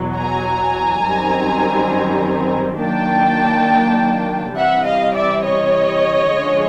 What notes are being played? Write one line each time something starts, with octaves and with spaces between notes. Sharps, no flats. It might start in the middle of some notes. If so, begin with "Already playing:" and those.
Already playing: E2 B2 F#3
G#5 A#5
F#2 D#3 G3 C4
D#3 F#3 A#3 D4 G5 A5
C3 E3 G3 E5 F#5
D#5 F5
D5 E5
C#5 D#5
D3 F3 G#3 C#4